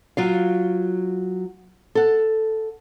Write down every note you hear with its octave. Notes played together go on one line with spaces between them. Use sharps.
F#3 F4 F5
A4 F#5